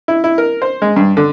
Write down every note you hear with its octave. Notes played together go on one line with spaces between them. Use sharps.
E4
E4
A#4
C5
G#3
G2
D3